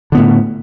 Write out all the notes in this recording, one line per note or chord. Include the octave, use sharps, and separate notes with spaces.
A2 D3 B3